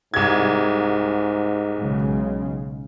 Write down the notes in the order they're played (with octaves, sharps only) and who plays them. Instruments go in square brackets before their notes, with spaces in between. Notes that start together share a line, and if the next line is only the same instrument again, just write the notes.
[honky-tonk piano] C2 G#6 [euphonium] G#2
[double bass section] B1 C#3 G#3